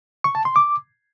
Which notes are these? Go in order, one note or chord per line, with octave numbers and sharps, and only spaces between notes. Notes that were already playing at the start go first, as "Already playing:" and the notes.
C#6
A5
C6
D6